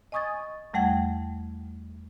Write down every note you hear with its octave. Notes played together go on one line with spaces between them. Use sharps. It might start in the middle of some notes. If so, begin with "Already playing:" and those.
D#5 G#5 C#6 D#6 G#6 A6
E2 G3 A3 F#5 G5 G#6